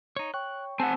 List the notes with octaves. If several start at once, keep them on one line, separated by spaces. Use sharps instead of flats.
D#4 C#5
C#5 G5 C#6 F#6
C3 C4 A4 F#5 G#5